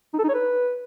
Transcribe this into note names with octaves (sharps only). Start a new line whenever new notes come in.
D#4
A4
D#4
C#5
B4